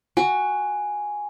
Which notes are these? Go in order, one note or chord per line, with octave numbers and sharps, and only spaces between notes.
F#4 G#5